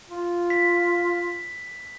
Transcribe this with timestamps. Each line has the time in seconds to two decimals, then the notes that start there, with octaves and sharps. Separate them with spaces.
0.10 F4
0.50 B6